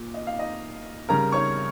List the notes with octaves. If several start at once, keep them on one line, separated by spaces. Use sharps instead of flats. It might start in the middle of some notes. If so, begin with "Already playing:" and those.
Already playing: A#2
D#5
F5
D#4 D#5
C#3 G3 A#4 A#5
C#5 C#6